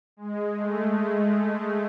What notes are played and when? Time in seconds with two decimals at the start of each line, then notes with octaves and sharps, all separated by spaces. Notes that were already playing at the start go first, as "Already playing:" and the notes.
0.17 G#3
0.56 A3
0.95 A3